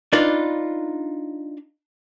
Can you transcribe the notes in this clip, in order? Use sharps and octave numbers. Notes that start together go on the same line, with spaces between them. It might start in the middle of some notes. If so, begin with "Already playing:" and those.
D4 D#4 F4 B4 D5